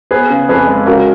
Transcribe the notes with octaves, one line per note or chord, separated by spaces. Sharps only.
B3 G#4 B4
C#3
F2 G#4 B4
G#3
C#3 F#4 A#4